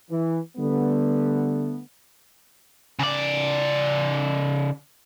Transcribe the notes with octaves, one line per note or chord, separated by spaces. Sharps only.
E3
D3 G3 A3 B3
C#3 D5